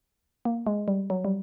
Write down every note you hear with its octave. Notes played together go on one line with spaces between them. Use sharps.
A#3
G#3
G3
F#3
G3